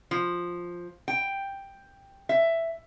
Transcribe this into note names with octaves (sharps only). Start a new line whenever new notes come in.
F3
G5
E5